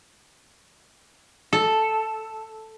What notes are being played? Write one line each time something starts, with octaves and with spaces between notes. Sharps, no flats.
A4